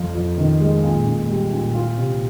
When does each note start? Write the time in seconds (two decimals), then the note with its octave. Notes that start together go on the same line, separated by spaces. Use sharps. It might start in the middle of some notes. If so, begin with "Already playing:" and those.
Already playing: F2 F4
0.15 F2
0.38 D#3
0.61 G#3
0.83 A#2
1.05 A#2
1.29 G3
1.51 A#2
1.75 F4
1.97 C3